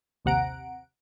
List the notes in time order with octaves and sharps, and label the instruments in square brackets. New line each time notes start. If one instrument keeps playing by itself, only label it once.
[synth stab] A#1 D#2 C3 F#5 A#5 D7